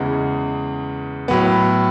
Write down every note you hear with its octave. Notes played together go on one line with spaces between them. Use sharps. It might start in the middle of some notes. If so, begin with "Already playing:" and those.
Already playing: E2 C#3 E3 G#3
A2 F#3 B3